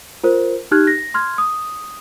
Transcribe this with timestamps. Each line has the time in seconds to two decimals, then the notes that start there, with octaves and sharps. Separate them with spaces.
0.24 F4 A#4 C5
0.71 D#4 G4 F6 F#6 G#6
0.87 A#6
1.14 C6 F6 G#6
1.38 D#6